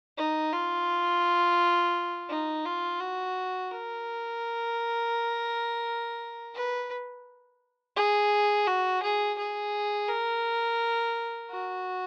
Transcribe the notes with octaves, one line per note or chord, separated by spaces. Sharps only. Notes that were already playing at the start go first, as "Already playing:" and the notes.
D#4
F4
D#4
F4
F#4
A#4
B4
G#4
F#4
G#4
G#4
A#4
F#4